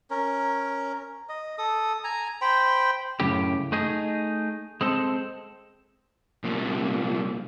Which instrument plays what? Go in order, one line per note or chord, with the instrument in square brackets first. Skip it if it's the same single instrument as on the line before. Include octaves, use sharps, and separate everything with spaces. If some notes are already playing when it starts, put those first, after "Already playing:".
[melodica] C#4 A#4
D#5
A4 D#6
G#5 A#5
C5 G5 B5
[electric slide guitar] F#2 A2 C#3 G4
A3 D#4 G#4
G#3 C4 A4
[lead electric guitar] C2 A#2